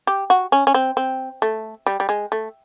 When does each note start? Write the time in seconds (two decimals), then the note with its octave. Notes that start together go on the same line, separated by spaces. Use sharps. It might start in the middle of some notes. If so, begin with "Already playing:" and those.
0.07 G4
0.30 F#4
0.52 C#4
0.67 C#4
0.74 C4
0.97 C4
1.42 A3
1.86 G3
2.00 G3
2.09 G#3
2.32 A3